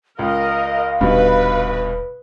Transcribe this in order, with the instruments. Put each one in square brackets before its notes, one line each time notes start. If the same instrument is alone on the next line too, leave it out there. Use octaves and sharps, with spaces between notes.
[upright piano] C#2 [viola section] A#4 D#5 [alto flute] F5
[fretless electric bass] D#1 [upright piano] G2 B2 D#4 [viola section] B4